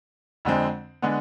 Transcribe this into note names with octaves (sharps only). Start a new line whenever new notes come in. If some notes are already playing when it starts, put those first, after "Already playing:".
F2 D3 G#3 C4
D3 G#3 B3